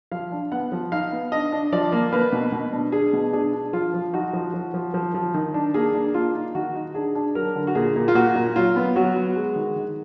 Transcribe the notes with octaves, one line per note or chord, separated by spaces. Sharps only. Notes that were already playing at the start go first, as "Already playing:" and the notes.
F3 F5
D4
B3 F#5
F3
D#4 F5
B3
D4 D#5
D4
F3 D5
A#3
A#3 B4
B2
B2
D4
D4 G#4
B2
D4 G#4
D4
F3 F4
F3
D#4 F#4
F3
F3
F3
F3
F3
D#3
D4
A#3 G#4
D4
A#3 F4
D#4
D#3 F#4
D#4
D4 G#4
D4
F#3 A#4
D3
F#4
A#2 G#4
A#2
F4
A#2 F#4
A#2
F#3 F4
B3
F#3 F#4
B3
G#3
D#3
D#3